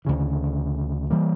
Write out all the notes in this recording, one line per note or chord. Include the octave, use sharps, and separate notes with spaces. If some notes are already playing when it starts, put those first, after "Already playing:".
D2 C#3 E3
E3 G3 A#3